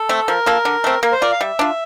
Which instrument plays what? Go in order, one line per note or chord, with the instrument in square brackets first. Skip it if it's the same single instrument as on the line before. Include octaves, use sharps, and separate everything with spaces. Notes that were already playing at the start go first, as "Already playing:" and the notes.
Already playing: [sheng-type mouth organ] A4
[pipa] A3 C4
[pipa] F3 [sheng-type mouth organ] A#4
[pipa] A#3 F4 A4
D3
A3 C4
[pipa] A#3 [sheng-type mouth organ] A#4
[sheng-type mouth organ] C5
[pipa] F4 A#4 [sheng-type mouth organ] D5
[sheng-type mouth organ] F5
[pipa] G3 [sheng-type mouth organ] E5
[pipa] D4 F4